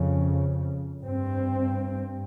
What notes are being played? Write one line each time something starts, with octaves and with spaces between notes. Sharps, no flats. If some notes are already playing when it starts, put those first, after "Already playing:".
Already playing: F2 C#3
G2 C4